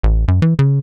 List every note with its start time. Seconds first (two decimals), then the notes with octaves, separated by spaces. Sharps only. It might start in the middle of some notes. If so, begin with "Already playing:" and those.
0.03 A1
0.28 F#2
0.42 E3
0.59 C#3